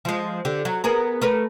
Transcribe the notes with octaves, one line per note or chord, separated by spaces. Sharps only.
F3 G#3
D3 G4
F#3
B3 G#4 A#4
A3 A#4 B4